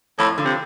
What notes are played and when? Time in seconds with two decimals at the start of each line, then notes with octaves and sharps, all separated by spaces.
0.19 F2 A2
0.38 D3 F3
0.44 C3